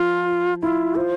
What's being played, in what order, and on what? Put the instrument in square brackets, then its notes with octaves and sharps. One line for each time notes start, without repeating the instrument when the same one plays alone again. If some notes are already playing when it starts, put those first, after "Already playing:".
Already playing: [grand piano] F3 [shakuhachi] F4
[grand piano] E4 [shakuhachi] F4
[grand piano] F4 [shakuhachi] C5